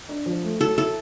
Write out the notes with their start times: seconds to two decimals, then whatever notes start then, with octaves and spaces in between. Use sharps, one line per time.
0.09 D4
0.26 F3
0.43 A3
0.60 F#3 A4
0.78 E4 A4